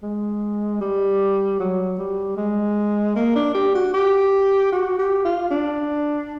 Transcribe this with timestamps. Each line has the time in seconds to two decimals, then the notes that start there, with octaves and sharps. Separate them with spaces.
0.03 G#3
0.81 G3
1.60 F#3
1.98 G3
2.37 G#3
3.16 A#3
3.35 D4
3.55 G4
3.75 F#4
3.94 G4
4.72 F#4
4.99 G4
5.25 F4
5.51 D4